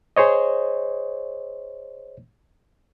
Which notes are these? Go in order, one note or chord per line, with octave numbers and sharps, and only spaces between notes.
G#4 C5 C#5 D#5